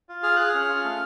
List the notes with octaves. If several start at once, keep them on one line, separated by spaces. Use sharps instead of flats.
F4
G#4 F6
G#4 F#6
C#4 F6
F4
A3